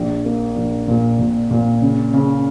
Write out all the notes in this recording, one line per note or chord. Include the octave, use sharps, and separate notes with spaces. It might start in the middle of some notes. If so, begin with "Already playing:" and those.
Already playing: A#1
A#3
A#1
A#2
A#2
A#2
C#3
C#3